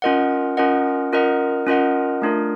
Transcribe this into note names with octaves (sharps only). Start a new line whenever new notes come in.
C#4 F4 A#4 D#5 F#5
C#4 F4 A#4 D#5 F#5
C#4 F4 A#4 D#5 F#5
C#4 F4 A#4 D#5 F#5
A3 D4 F4 A#4